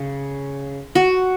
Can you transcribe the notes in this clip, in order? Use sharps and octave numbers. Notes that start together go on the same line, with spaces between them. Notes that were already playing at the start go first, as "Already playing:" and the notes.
Already playing: C#3
F#4